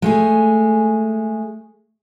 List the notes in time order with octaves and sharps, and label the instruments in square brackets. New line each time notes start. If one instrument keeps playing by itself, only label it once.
[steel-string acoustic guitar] G#3 A3 G#4